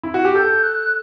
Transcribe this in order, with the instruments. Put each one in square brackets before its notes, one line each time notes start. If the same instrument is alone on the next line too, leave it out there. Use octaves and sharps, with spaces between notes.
[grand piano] E4
F#4
G4
[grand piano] A4 [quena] G6
[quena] F#6